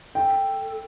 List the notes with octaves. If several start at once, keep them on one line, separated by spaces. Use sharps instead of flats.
A4 G5